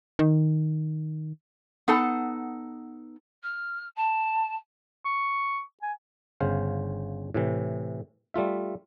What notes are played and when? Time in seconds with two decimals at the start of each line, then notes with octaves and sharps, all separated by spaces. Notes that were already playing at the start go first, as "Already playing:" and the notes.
0.19 D#3
1.88 B3 D#4 A4 F#5 A5
3.43 F6
3.96 A5
5.05 C#6
5.82 G#5
6.40 G1 C#3 C5 F5
7.34 A2 C3 E3
8.34 G3 A3 F4 E5